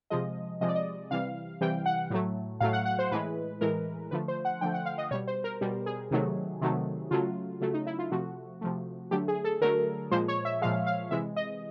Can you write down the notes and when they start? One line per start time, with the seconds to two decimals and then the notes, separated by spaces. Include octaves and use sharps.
0.10 C3 F3 G#3 D#5
0.61 C3 F3 G#3 D#5
0.68 D5
0.75 D#5
1.11 C3 E3 G3 F5
1.61 C3 E3 G3 G5
1.86 F#5
2.10 A2 F#3 A3
2.60 A2 F#3 A3 F5
2.73 F#5
2.86 F#5
2.99 C5
3.12 A2 E3 G#3 B4
3.61 A2 E3 G#3 A#4
4.11 D3 F3 A3 B4
4.28 C5
4.45 F#5
4.61 D3 F3 A3 G5
4.74 F#5
4.86 F5
4.98 D#5
5.11 B2 G3 C#5
5.27 C5
5.44 A#4
5.61 B2 G3
5.86 G#4
6.11 C3 D#3 F#3 A3
6.61 C3 D#3 F#3 A3
7.11 C#3 F#3 A3 F4
7.61 C#3 F#3 A3
7.74 D#4
7.87 E4
7.99 F4
8.12 C3 F3 A3 F#4
8.61 C3 F3 A3
9.11 D3 F#3 A3 G4
9.28 G#4
9.44 A4
9.61 D3 F#3 A3 A#4
10.11 A#2 F3 G#3 C5
10.28 C#5
10.45 E5
10.61 A#2 F3 G#3 F5
10.87 F5
11.11 C3 E3 G#3 E5
11.36 D#5